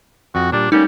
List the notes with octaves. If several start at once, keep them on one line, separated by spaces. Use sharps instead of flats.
F2 F#4
A#2 G3 D4
G3 A3 A#3 C#4 D#4